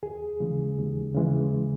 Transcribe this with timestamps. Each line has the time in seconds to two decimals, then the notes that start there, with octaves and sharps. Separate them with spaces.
0.03 D#2 G#4
0.40 C#3 E3 G#3
0.78 D#2
1.15 C#3 E3 G#3